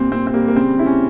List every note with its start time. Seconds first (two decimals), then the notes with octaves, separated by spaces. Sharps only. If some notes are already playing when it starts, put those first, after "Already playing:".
Already playing: A#2 G3 C4
0.11 A#2 C4
0.27 C4
0.34 G3 A#3
0.48 A#3
0.56 C#3 C4
0.78 C#3 E4
0.86 C#4